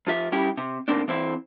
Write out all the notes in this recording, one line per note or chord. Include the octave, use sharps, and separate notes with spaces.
F2 F4 E5
G3 C#4 E4 G4
C3
A2 D#3 A3 A#3 C4 D4
E3 C4 E4